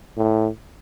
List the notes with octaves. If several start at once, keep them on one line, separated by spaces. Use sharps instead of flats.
A2